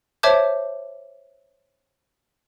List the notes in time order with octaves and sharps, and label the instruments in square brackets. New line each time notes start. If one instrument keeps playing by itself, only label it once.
[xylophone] C5 C#5 E5 A5 D6 G6